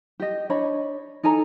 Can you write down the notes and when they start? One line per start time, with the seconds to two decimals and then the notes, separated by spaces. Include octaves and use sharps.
0.20 G4 D#5
0.50 D4 C#5 D#5 B5
1.23 D#4 A4 G#5 A#5